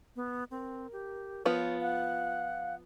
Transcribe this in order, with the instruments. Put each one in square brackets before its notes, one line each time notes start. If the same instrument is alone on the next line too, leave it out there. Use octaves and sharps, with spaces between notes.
[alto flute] B3
[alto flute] C4 [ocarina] A#4
[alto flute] G4
[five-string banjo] F3 B3 F4 [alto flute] C#5
[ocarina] F5 [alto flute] F#5